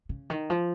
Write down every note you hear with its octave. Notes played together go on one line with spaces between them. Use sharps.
C#3
D#3
F3